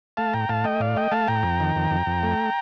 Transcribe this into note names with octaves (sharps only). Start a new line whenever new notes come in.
A3 F5 A5
A2 G5 A#5
A2 F5 A5
A3 D#5 G5
A2 D5 F5
A3 D#5 G5
A3 F5 A5
A2 G5 A#5
F2
D#3
F2
F2
F2
A3